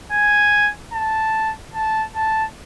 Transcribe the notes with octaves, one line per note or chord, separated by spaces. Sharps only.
G#5
A5
A5
A5